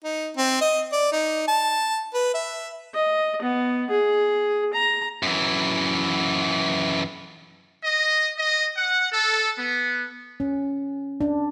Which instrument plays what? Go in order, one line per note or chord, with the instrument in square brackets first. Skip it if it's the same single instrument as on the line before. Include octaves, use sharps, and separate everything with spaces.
[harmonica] D#4
C4
D#5
D5
D#4
A5
B4
E5
[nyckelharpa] D#5
B3
G#4
A#5
[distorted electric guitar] F#2 E3
[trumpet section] D#5
D#5
F#5
A4
B3
[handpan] C#4
D4